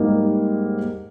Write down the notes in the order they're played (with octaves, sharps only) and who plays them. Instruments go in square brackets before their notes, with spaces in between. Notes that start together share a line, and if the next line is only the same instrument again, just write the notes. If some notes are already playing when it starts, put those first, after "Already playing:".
Already playing: [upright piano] G#2 G3 A#3 D#4